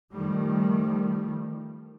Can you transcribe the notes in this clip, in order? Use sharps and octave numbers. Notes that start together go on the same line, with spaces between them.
D#3 F3 G3 A3